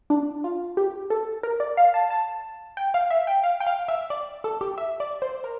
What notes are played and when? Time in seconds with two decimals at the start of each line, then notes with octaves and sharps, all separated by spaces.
0.10 D4
0.44 F4
0.77 G4
1.10 A4
1.43 A#4
1.60 D5
1.77 F5
1.94 A5
2.10 A5
2.77 G5
2.94 F5
3.10 E5
3.27 G5
3.44 F5
3.60 G5
3.67 F5
3.88 E5
4.10 D5
4.44 A4
4.61 G4
4.78 E5
5.00 D5
5.22 C5
5.44 A#4